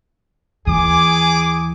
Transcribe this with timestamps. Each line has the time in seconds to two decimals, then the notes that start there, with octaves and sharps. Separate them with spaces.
0.67 D#2 E3 G#4 G#5 D6